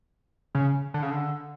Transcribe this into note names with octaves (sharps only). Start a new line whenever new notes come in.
C#3
D3
C#3
D3